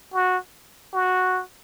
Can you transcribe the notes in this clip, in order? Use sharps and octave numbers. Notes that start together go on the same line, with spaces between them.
F#4
F#4